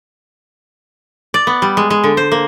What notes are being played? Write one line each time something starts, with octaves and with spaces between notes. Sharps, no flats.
D5
B3
G3
G#3
G#3
D3
C5
A#3